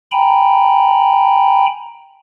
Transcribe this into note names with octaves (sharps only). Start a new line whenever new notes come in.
G5 G#5 A#5 B5